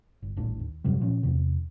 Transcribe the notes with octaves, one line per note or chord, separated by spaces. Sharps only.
G1
D#1 A1 D4
D#2
F#2 C3 F#3 G3
A#2 F3 C#4
E2 C3